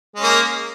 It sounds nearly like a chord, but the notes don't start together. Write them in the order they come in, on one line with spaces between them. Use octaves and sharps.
G#3 C#4 A#3